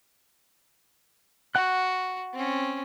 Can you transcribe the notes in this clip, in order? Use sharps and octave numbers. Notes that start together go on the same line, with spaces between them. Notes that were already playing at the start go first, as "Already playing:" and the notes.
F#4 F#5 F#6
C4 C#4